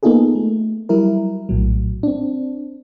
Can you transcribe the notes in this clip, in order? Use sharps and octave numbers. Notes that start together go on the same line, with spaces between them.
A#3 B3 D#4 F4 G#4 A4
A3
F#3 G3 E4 A#4
A#1 A2 F#3
C4 D4